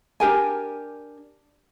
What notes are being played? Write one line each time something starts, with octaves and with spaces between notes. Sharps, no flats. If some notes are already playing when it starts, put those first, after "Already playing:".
D4 G4 A#4 G#5